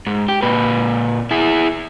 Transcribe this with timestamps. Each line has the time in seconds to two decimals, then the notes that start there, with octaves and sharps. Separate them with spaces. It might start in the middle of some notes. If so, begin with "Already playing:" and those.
0.07 G#2
0.28 G4
0.42 A#2 B4
1.31 E4 G#4